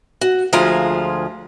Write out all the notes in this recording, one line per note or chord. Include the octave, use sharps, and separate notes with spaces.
F#4
D2 F3 G#3 F4 G#4 A#5